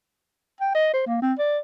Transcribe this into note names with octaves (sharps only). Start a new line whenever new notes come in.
G5
D#5
C5
A#3
C4
D5